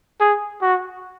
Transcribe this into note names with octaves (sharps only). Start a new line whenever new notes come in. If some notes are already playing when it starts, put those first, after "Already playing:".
G#4
F#4